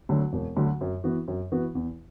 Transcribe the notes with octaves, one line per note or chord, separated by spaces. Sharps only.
D2 D3 F#3
E1
D2 D3 F#3
F#2
E3 B3 F#4
F#2
E3 B3 F#4
E2